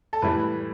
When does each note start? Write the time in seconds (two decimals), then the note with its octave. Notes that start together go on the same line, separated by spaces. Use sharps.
0.13 A4
0.22 A2 E3 G3 B4